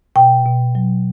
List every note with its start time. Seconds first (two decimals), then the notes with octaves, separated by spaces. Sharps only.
0.16 B2 G5
0.45 B2
0.75 F#3